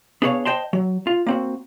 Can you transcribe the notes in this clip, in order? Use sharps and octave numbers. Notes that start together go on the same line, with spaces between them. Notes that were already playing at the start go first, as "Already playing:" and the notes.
B3 D4 G#4 C5 C#5 F5
C5 D#5 G5 A5 C6
F#3
F4
A#3 C4 F#4